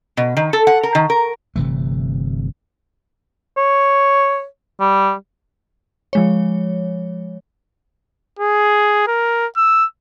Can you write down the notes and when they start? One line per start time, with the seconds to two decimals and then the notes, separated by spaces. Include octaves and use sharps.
0.17 B2
0.37 D#3
0.53 A4
0.67 F#5
0.83 A#4
0.95 D#3
1.10 A#4
1.56 G1 C3 E3 A3
3.57 C#5
4.80 G3
6.13 F3 G#3 C#5
8.39 G#4
9.07 A#4
9.57 E6